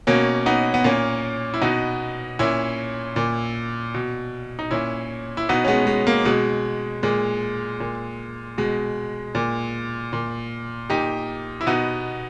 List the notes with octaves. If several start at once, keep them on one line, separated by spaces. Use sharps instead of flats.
B2 A#3 C#4
B3 D#4
B3
A#2 A#3 C#4
E4
B2 B3 D#4
A#2 C#4 E4
A#2
B2
D#4
A#2 C#4 E4
E4
B2 B3 D#4
C#4
G#3 B3
G#3
A#3
B2 G#3
A#2 G#3
A#2
B2 G#3
A#2
A#2
A#2 D#4 G4
E4
B2 B3 D#4